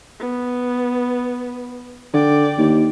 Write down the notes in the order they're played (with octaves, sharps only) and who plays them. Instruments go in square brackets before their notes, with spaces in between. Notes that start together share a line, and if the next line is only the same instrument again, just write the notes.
[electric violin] B3
[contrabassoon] D3 [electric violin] D5 G5
[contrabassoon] D#2